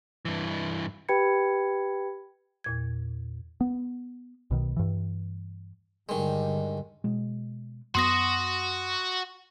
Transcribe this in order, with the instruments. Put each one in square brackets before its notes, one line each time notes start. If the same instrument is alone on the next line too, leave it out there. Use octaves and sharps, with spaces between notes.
[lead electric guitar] G2 E3
[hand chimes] G4 B4 G5 B5 G#6 C#7
[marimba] E2 A#2 G#6
[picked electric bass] B3
B1 B2 D#3
G2 E3
[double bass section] G2 D3 G3 [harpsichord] D#3 G#3
[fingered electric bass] B2 G#3
[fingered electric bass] F#2 B3 [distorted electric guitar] F#4 [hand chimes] C6 D#6 A#6